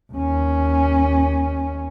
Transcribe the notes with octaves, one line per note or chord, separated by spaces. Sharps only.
D#2 C#4